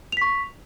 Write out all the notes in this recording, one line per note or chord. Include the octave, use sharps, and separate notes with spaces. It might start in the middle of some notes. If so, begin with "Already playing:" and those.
C#6 B6 F7